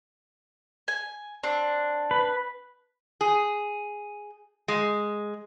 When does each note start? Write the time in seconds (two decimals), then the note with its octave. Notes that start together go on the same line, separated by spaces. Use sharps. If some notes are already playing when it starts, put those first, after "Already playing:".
0.88 G#5
1.43 C4 D4
2.11 B4
3.21 G#4
4.68 G#3